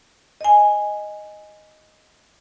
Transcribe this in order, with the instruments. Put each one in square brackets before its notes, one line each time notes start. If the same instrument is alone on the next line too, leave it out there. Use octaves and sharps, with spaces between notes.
[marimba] D#5 G#5